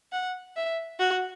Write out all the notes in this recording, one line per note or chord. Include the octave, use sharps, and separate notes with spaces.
F#5
E5
F#4